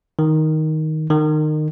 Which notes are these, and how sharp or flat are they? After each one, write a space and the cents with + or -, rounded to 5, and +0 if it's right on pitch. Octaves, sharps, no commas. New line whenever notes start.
D#3 +5
D#3 -25